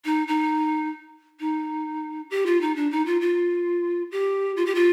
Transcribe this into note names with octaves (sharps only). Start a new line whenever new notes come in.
D#4
D#4
D#4
G4
F4
D#4
D4
D#4
F4
F4
G4
F4
G4
F4